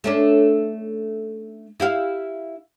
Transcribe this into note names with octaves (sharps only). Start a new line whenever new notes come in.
A3 C#4 D4
E4 G4 F5